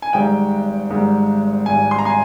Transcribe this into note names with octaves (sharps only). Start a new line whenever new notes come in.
G#5
G#1 G#2 G3 G5
G#1 G#2 G3
G#1 G#2 G3 G#5
C6
A#5
G#5 C6